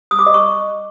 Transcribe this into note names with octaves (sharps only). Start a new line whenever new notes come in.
D#6
D6
D#5
C#6